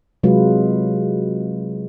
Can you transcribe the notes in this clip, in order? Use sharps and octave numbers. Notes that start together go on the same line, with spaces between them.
C3 F#3 G#3 F4 B4